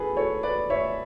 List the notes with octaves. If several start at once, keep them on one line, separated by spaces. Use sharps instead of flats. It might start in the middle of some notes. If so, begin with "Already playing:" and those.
Already playing: G#4 A4 B4
A4 C#5
B4 D5
C#5 E5